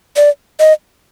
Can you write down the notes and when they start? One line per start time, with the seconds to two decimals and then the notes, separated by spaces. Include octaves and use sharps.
0.16 D5
0.60 D#5